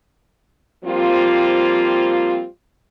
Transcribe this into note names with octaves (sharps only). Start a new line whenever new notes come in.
F3 G3 A#3 C4 F4